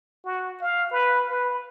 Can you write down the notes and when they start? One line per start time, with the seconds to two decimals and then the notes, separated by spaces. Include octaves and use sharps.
0.25 F#4
0.61 F5
0.91 B4
1.29 B4